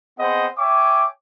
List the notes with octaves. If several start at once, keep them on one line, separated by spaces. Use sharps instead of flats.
B3 C4 G#4 C5 D#5 F#5
C#5 E5 G5 G#5 D6